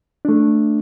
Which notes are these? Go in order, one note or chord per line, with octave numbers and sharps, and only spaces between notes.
A3 D4